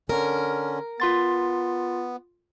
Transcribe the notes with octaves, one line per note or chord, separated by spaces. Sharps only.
D3 C#4 A#4
B3 F4 C6 A6